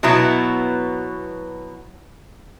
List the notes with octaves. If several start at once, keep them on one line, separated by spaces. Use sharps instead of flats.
B2 F#3 B3 E4